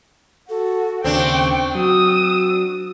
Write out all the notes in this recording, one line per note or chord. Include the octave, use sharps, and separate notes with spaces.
F#4 A4
D#2 C#3 C4 D4 C5 G5 C#6
F#3 F#4 D#6 E6